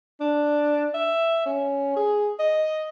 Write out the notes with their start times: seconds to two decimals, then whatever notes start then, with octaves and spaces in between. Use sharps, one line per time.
0.20 D4
0.94 E5
1.46 C#4
1.96 G#4
2.39 D#5